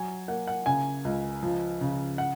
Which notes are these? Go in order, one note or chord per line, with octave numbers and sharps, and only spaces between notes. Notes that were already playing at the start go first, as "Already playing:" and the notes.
Already playing: F#3 G#5
A#3 F#5
F#5
C#3 G#5
C#2
F3
C#3
F#5